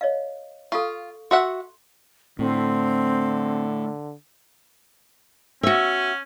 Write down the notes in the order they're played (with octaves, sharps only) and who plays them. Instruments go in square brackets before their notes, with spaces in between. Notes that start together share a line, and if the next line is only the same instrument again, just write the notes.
[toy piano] C#5 D#5 F5
[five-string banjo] F4 [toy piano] A4 F5 C#6
[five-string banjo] F#4 E5 F#5 [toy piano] C6
[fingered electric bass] A2 [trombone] D3 [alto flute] C4
[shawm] C#4 [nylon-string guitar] F#4 E5